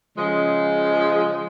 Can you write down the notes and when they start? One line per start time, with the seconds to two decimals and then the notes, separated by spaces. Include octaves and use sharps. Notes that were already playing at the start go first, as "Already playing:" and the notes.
0.18 C#3 F3 G#3